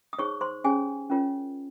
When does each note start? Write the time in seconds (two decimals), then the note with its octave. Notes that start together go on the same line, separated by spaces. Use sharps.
0.13 D#6
0.19 D#4 G#4 C5 C#5 C#6
0.41 C5 C6
0.64 C#4 G4 G#4 C#5 G#5
1.10 C#4 F4 A#4 C#5